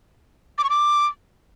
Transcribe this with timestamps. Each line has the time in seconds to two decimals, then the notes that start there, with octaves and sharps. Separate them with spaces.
0.58 D6
0.64 C#6
0.70 D6